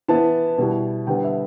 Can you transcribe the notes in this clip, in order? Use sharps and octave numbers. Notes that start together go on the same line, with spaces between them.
E3 B3 E4 A5
B2 G3 E4
D3 G3 B3 G5
E5